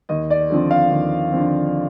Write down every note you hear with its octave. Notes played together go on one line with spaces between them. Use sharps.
D#2 D#5
D5
D3 F3 C4
F5
D#2
D3 F3 C4